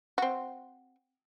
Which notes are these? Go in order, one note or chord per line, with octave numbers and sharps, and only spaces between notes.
C4 F#4